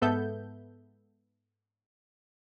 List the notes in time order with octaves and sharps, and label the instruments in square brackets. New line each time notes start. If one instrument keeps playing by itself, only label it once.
[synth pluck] G#2 B3 A4 E5 G6